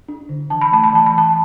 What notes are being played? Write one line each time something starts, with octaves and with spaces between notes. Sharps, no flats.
D4
D3
E3 A5
B5
A3 A5
B5
E3 A5
B5
E3 A5